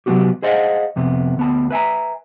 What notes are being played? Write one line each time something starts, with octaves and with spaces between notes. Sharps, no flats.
C3 F#3 B3 C4 F#4 G4
G#4 C5 D#5 F5 F#5
F2 C3 B3
D2 B3 A5
B4 E5 G#5 A#5